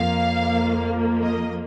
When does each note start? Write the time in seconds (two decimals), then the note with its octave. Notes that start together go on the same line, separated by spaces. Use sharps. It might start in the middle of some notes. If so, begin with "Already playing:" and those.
Already playing: F2 F3 A#3 F5
1.23 D#5